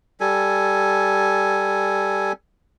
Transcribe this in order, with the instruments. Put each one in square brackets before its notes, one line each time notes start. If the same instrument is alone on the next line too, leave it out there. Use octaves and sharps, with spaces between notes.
[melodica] G3 A4 G#5